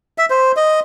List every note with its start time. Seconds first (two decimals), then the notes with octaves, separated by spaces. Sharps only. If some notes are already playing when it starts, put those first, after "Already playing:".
0.18 E5
0.30 C5
0.56 D#5